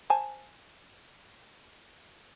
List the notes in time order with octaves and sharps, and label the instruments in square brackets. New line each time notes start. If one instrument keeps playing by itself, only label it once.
[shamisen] C5 G#5 A5